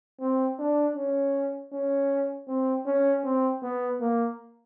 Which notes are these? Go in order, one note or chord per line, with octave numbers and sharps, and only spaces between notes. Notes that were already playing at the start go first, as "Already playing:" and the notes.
C4
D4
C#4
C#4
C4
C#4
C4
B3
A#3